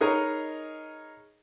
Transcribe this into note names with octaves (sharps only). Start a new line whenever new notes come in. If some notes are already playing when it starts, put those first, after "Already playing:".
D#4 G#4 A#4 B4 C#5 D#5